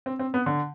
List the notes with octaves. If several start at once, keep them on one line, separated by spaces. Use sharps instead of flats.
C4
C4
B3
D3